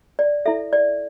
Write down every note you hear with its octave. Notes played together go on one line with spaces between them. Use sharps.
D5
E4 A4 E5
D5